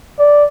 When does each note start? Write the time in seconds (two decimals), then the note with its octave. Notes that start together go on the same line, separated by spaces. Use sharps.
0.19 D5